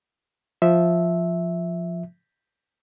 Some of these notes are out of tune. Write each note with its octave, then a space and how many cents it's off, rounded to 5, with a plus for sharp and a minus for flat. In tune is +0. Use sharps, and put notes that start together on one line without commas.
F3 +0 E5 -5